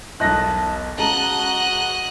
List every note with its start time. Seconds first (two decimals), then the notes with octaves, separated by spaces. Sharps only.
0.20 E1 B1 D#5 A5 F#6 A#6
0.98 C#3 G#3 F#4 D#5 A5 A#5 F#6